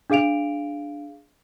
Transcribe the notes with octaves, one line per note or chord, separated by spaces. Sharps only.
D4 G#4 F5 D7 F7